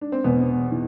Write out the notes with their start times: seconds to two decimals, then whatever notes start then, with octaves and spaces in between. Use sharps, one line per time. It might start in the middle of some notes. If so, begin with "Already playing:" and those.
0.01 D4
0.12 C4
0.24 E2 B2 B3
0.71 E3